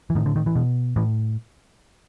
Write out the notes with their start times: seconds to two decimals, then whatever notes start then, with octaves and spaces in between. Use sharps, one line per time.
0.10 E3
0.15 A2 D#3
0.26 D3
0.36 D#3
0.46 E3
0.55 B2
0.96 A2 E3